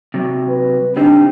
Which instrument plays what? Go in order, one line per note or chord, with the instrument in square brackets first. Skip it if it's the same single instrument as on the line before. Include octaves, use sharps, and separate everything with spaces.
[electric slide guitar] C3 F#3
[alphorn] B4
[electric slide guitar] C#3 C4 D#4 [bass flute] D4 [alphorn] G4